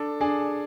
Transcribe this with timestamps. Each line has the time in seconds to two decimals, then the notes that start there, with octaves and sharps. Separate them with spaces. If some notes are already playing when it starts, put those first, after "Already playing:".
Already playing: D4 A4
0.21 D4 G#4